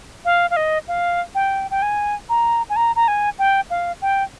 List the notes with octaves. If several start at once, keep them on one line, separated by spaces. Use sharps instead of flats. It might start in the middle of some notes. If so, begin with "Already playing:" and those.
F5
F5
D#5
F5
G5
G5
G#5
A#5
G#5
A#5
A#5
G#5
G5
F5
G5